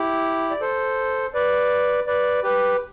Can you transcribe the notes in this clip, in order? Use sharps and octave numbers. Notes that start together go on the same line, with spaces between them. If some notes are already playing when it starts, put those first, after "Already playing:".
Already playing: E4 G4
D5
A4 C5
B4 D5
B4 D5
G4 B4